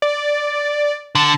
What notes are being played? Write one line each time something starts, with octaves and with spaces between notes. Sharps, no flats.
D5
D3 A5